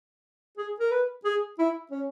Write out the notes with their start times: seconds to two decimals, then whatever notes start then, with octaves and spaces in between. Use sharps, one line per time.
0.57 G#4
0.79 A#4
0.91 B4
1.25 G#4
1.58 E4
1.91 C#4